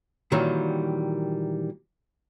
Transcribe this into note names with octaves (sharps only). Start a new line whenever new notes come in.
A#2 D#3 E3 F#3 G3